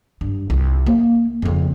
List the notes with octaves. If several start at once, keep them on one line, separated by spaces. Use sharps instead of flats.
G2
C2 F4
A#3
F2 C#3